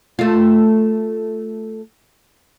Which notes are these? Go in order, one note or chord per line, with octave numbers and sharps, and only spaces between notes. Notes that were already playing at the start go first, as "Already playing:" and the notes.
A3 F4